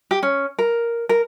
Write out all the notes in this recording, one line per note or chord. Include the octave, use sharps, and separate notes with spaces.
G4
C#4
A#4
A#4